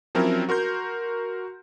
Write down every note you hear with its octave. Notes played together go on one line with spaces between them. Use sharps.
F3 F#3 C4 C#4 E4 A#4
F#4 A#4 C6 G6